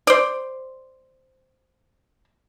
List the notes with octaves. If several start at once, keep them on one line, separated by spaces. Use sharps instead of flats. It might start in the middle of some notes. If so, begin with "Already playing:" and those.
C5 D5